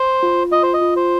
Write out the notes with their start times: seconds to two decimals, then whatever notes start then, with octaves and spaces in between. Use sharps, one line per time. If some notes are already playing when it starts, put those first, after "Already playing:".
Already playing: C5
0.23 F4
0.52 F4 D#5
0.63 C5
0.74 D#5
0.81 F4
0.96 C5